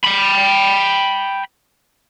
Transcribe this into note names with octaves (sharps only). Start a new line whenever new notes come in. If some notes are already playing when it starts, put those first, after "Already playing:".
G5 B5